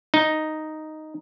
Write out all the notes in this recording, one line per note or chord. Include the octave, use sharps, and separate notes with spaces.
D#4